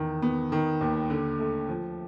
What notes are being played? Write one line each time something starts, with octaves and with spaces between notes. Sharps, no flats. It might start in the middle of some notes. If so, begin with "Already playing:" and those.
Already playing: E2 D#3
B3
D#3
D#2
D3
A3
F3